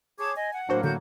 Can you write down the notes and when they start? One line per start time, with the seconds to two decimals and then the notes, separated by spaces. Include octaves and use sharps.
0.19 G#4 C#5 A5 D6 G#6
0.36 D#5 G#5
0.53 F#5
0.69 A2 F#3 A#3 D4 F#4 C5
0.84 D3 F#4 G6